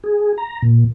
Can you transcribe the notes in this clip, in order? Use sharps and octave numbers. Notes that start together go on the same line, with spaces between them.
G#4
A#5
A#2